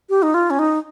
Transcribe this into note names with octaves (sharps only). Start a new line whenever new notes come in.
G4
D#4
F4
C#4
D#4